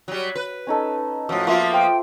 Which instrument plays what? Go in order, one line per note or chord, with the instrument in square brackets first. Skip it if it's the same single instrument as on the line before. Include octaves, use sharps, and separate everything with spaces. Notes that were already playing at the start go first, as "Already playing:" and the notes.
[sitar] F#3 G3
B4
[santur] C#4 D#4 A4
[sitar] A2 F3 [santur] F#3 E6
[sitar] F3 A#3 B3 [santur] F4 E5 D6
[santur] C5 [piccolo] G5